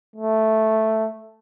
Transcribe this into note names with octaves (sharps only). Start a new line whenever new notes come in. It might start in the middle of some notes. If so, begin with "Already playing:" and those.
A3